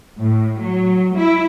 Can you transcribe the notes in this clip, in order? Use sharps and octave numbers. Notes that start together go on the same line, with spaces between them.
A2
F#3
E4